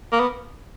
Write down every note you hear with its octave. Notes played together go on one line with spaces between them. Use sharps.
A#3
B3